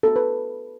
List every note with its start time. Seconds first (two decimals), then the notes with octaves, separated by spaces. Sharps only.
0.03 B3 F#4 A4
0.16 B4